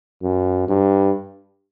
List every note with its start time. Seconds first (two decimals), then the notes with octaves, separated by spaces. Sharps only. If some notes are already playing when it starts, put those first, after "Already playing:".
0.22 F#2
0.69 G2